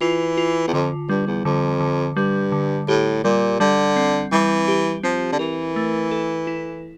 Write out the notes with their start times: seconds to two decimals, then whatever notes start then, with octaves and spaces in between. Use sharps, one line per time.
0.01 E3 F4
0.37 F4
0.67 E2
0.73 F2 D3
1.09 G2 G3
1.27 E2
1.45 F2 D3
1.81 D3
2.17 G2 G3
2.52 D3
2.88 A2 G4
3.24 A#2 G3
3.60 D3 G3
3.96 C4
4.32 E3 G3
4.68 G4
5.03 F3 C4
5.32 D3
5.39 E3 A#4
5.76 A3
6.11 A4
6.47 E4